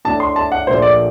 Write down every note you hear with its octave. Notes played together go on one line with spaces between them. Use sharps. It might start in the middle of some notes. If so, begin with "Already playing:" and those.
A2 A3 D4 A5
C6
A5
F#5
A#1 A#2 A3 C5
D5